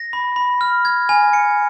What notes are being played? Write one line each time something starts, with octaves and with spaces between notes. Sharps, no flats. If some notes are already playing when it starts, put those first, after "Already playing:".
Already playing: A#6
B5
B5
F6
G#6
G#5
C#7